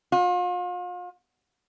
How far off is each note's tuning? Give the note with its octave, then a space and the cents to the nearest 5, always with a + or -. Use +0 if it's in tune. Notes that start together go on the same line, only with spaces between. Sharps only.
F4 +40